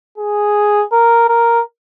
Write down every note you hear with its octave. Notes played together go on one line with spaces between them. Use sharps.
G#4
A#4
A#4